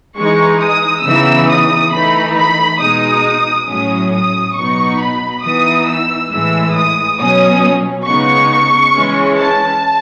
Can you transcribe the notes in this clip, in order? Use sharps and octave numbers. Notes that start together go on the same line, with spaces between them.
E3 G#3 D#4 C#6
D#6
C#3 E3 B3 D#4 E6
D#6
E3 A3 D#4 B5
B5
B2 G#3 D#4 D#6
A2 F#3 C#4 D#6
D#6
B2 F#3 B3 D#4 C#6
B5
E3 B3 D#4 D#6
E6
A2 E3 G#3 E6
D#6
B2 F#3 C#4 D#6
C#3 G#3 B3 D#4 C#6
E3 G#3 C#4
A5